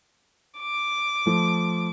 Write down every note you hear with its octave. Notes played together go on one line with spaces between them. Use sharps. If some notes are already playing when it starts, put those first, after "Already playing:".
D6
F3 A3